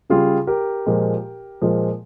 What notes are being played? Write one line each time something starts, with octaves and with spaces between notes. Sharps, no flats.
C#3 G3 F4 G#4
G4 A#4
A#2 F3 G#3
A#2 F3 G#3